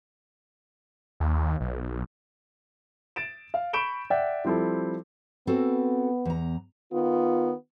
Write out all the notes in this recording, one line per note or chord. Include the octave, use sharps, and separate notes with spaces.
D#2
B1
A6 D7 E7
F5
B5 C#6 G6 D7 E7 G7
D5 E5 F#5 G5
F3 G3 C4 E4 A4
B3 C4 F#4 A4
E2 A#5
D#3 B3 F4